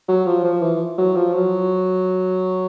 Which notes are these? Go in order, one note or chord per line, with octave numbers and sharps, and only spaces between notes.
F#3
F3
F3
E3
F#3
F3
F#3